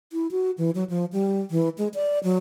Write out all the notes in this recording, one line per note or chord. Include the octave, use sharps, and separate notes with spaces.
E4
F#4
E3
F#3
F3
G3
E3
G#3
D5
F#3